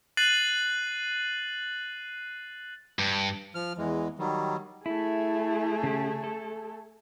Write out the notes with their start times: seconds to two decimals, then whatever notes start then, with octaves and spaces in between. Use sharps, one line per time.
0.17 F#6 A6 C7 D#7 F#7
2.99 G2
3.55 F3 F6
3.78 E2 E3 G#3
4.19 D#3 F#3 G3
4.86 A3 E4 G#4
5.83 C#3 G4
6.24 A4